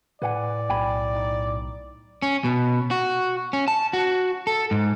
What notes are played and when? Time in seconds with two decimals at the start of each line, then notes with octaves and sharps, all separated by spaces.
0.22 A2 B4 D5 F#5 G#5
0.69 B1 G5 G#5 B5
1.15 D#4
2.22 C#4
2.44 B2
2.91 F#4
3.53 C#4
3.68 A5
3.93 F#4
4.47 A4
4.71 G#2